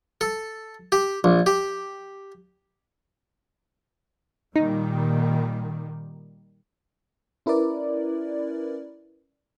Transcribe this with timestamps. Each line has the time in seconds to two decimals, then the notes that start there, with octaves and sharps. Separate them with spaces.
0.21 A4
0.92 G4
1.24 A#1
1.46 G4
4.56 A#2 D#3 G3 D#4
7.46 C#4 E4 A#4 B4 D5